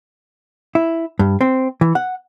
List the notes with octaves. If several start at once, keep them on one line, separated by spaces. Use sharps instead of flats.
E4
G2
C4
E3
F#5